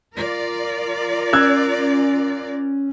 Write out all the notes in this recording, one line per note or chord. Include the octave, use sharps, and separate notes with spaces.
F4 A#4 D5
C#4 E6 F#6 G#6